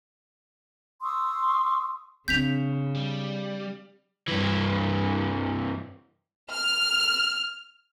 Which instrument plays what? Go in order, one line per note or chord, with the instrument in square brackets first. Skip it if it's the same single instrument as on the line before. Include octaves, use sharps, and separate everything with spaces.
[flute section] C6 C#6 D#6 E6
[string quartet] C#3 [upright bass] C4 D4 [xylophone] G6 B6 F7
[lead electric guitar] G3
[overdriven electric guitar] G2 E3
[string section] F6